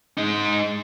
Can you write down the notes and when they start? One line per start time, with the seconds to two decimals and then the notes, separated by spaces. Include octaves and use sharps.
0.17 G#3 D#4